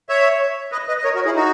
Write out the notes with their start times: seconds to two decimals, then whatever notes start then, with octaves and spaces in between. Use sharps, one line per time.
0.09 C#5 E5
0.72 B4 D#5
0.88 B4 D#5
0.98 D#5
1.04 A#4 C#5
1.15 F#4 A#4
1.25 E4 G#4
1.35 D#4 F#4